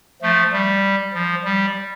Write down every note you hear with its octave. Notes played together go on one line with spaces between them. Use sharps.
F3 A3
G3
F3
G3